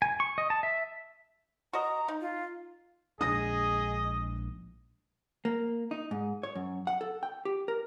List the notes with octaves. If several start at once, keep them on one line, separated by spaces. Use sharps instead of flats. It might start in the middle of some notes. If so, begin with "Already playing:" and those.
G#5
C#6
D#5
A5
E5
F#4 A#4 D#5 A#5
D#4
F4
A#1 G#3 D4 G#4 D#5 D#6 A#6
A#3
D#4
G#2
C#5
F#2
F#5
A4
G5
G4
A#4